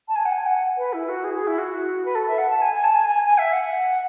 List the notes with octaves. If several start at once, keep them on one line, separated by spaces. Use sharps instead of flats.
A5
G#5
F#5
G#5
F#5
B4
E4
F#4
G#4
G#4
E4
F#4
B4
A4
E5
F#5
A5
G#5
G#5
A5
G#5
G#5
G#5
E5
F#5